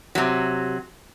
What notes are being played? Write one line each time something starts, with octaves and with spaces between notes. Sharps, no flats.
C3 F#3